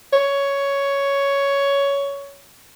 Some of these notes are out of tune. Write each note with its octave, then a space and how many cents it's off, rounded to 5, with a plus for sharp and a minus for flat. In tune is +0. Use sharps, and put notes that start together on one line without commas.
C#5 +10